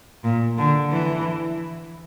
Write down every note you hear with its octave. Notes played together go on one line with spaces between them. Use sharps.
A#2
D3
E3